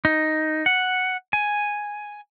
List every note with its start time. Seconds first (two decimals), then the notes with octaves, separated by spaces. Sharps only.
0.05 D#4
0.66 F#5
1.33 G#5